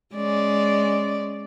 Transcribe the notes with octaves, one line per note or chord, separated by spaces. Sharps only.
G#3 C#4 D5